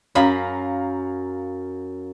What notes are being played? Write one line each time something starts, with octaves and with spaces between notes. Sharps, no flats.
F#2 C#5 F5 A#5 B5